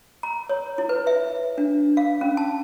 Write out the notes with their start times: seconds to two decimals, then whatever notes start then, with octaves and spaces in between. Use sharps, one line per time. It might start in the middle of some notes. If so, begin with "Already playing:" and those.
0.23 A#5
0.49 C#5
0.78 E4
0.89 B4
1.07 E5
1.58 D4
1.97 F5
2.21 C#4
2.37 A5